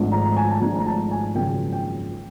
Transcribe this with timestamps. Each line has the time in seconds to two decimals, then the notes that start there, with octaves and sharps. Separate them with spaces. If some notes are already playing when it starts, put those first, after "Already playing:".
Already playing: G#1 G#2 F3 A3 D4
0.12 A#5
0.37 G#5
0.51 A5
0.61 G#1 G#2 F3 A3 D4 A#5
0.79 A#5
0.87 A5
1.11 G#5
1.35 G#1 F#2 C#3 F3 A#3 G5
1.72 G5